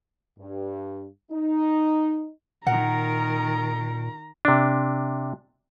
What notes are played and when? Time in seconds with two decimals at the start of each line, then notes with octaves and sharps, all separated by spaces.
0.39 G2
1.31 D#4
2.67 A#2 D#3 A#4 F#5 A#5
4.45 C3 D4